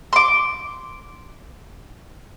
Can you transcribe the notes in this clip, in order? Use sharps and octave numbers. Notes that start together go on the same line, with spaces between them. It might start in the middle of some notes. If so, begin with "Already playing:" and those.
C6 D6